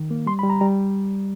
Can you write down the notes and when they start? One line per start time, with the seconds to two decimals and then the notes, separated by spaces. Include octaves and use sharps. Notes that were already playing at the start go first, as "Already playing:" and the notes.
Already playing: D#3
0.11 A#3
0.26 G3 C6
0.39 B5
0.43 G3
0.50 A#5
0.61 G3 A#5